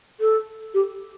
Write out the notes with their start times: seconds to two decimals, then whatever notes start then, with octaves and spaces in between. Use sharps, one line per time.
0.20 A4
0.74 G4